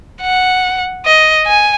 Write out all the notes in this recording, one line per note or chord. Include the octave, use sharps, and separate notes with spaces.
F#5
D#5
G#5